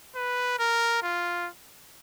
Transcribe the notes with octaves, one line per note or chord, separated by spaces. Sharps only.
B4
A#4
F4